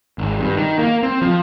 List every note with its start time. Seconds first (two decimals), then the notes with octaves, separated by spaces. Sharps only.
0.18 G#1
0.40 G2
0.57 D#3
0.79 A#3
1.03 C4
1.22 F3